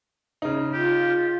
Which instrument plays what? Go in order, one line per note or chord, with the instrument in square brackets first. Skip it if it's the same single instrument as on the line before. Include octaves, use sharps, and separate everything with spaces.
[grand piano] C#3 D#4
[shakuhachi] F4 [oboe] G4